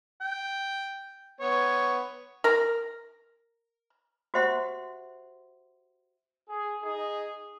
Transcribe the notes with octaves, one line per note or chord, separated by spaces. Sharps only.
G5
B3 C#5
A#4 A#5
F#4 G4 C5 E5 F#5 C6
G#4
D#4 G#4